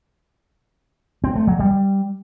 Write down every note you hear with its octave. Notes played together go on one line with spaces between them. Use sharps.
C4
A3
F#3
G3